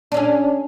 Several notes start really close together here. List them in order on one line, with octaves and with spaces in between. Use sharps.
D4 C#4 G#4